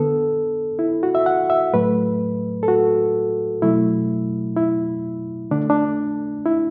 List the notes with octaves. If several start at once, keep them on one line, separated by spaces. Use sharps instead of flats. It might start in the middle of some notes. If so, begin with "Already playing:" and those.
Already playing: D3 B3 A4
E4
F#4
E5
F#5
E5
A2 F#3 A3 B4
A4
F#4
B2 F#3 A3 E4
E4
D3 A3 D4
D4
E4